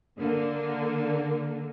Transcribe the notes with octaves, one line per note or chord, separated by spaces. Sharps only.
D3 A#3